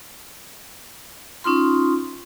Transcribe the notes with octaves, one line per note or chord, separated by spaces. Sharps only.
C#4 D#4 F4 C6